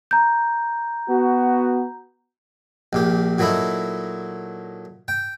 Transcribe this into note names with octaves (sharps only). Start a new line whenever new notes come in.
A#5 G6
B3 F#4
A#1 A#2 G4
A#2 F#3 A3 D#4 E4
G5